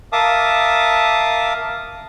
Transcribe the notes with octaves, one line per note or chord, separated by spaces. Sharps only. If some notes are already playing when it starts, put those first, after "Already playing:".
A#4 E5 F5 A5 D6 D#6